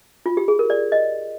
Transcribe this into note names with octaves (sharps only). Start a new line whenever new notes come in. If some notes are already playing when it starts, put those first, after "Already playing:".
F4
G4
G#4
A#4
D5
D#5